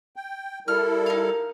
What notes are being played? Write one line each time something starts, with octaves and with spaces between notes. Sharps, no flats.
G5
G3 E4 A4 A#4 F6
D#4 F5